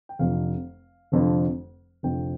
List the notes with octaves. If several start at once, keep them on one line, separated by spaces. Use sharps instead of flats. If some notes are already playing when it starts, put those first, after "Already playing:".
G5
F1 F2 D3 F3 F5
F1 F2 D3 F3
F1 F2 D3 F3 G5